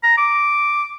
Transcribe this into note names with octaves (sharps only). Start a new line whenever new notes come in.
A#5
D6